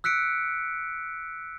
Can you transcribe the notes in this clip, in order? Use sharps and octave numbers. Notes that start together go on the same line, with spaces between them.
E6 F#6 B6 C#7 D7